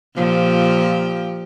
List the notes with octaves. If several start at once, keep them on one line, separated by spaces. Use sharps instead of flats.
A#2 F3 G4